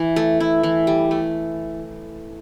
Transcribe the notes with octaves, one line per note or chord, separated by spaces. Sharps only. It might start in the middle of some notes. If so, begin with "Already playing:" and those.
Already playing: E3
A3
E4
E3
G3
A3